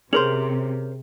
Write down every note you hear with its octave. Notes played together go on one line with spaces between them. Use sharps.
C3 C#4 G#4 A#4 C5 F7 F#7